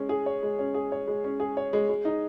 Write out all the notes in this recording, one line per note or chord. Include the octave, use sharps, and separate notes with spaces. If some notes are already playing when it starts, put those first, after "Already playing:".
Already playing: G#3 C#4
G#4
C#5
G#3
C#4
G#4
C#5
G#3
C#4
G#4
C#5
G#3
G#3
D#4